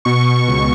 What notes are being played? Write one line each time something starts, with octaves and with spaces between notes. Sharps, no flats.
B2 C#6
C#2